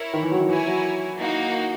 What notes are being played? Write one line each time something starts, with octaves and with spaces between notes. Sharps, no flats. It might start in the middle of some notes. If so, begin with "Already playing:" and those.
Already playing: E4 A#4 C#5
D#3
E3
F#3
D#3
E3 E4 A#4 C#5 G#5
F#3
A#3 D#4 F#4